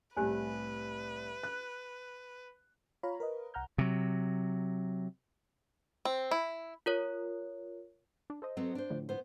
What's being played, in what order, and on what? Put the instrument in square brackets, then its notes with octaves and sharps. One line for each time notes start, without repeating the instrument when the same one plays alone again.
[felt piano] C2 A2 [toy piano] G4 C5 G#5 [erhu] B4
[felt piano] F#6
[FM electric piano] F4 C#5 F5 A#5 B5
A#4 B4 D#5
C2 F#5 A#5 F6 G6
[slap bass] C3 F#3
[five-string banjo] C4
E4
[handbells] F4 A#4 C#5
[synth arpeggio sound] D4
A4 C5 D#5
[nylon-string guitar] F#3 B3 C4
D4 C5
[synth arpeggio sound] A2 D3 F3
[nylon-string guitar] B3 C5